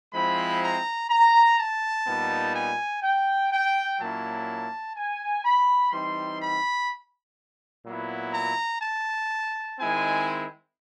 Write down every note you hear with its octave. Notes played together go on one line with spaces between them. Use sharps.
F3 G#3 C4 E4 B5
A#5
A#5
A5
A#2 G3 B3 D#4
G#5
G5
G5
A#2 F#3 A#3 C#4 E4 A5
G#5
B5
E3 G3 C4 D#4 C6
B5
A#2 F#3 B3 E4
A#5
A5
D#3 G#3 C4 E4 G#5